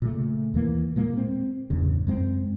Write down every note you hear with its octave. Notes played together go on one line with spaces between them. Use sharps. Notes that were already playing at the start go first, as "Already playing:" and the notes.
A#2 C#3 A3
D#2 E3 A#3
A#2 G#3 A#3
C4
A1 E2 G2 C#3
F#2 G#3 A#3 C4